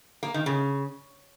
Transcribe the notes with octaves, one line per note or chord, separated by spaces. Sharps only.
A#3
D#3
C#3